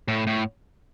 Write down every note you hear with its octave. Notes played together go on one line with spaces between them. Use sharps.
A2
A2